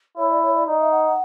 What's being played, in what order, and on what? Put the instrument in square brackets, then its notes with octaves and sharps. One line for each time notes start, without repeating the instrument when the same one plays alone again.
[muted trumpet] E4 [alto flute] C#5
[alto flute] D5
C#5
D5
[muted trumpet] D#4 [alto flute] D5
[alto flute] E5
F#5
F#5